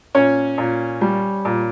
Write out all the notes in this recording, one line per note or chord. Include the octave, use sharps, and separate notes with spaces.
A#2 C#4 C#5
A#2
G3
A#2